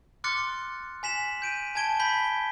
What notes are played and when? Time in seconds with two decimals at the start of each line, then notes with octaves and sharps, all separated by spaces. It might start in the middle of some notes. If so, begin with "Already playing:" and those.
0.24 C6 D6 F6 F#6 A6 C#7
1.03 G#5 B6 E7 F#7
1.42 G6 D7 D#7
1.75 G#5 A5 G#6 D7 G7
2.00 B5 G6 B6 G7